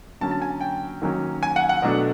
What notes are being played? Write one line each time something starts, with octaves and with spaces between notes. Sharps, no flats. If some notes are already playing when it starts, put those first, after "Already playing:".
D3 F#3 A#3 C#4 A5
A5
G#5
G5
D#3 F#3 A#3 C#4
G#5
F#5
F#5
B2 F#3 A3 D4